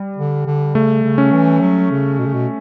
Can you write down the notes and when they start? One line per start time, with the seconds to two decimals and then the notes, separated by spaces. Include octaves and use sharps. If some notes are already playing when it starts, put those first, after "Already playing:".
Already playing: G3
0.17 D3
0.46 D3
0.75 C#3 A3
1.04 C#3
1.18 C#4
1.32 E3
1.61 F#3
1.91 C#3
2.19 B2
2.26 C#3
2.34 B2